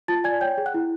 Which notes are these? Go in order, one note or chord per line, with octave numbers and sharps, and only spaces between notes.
F4 A5 A6
D5 G#5 G#6
C#5 G5 G6
G#4
F#5 F#6
E4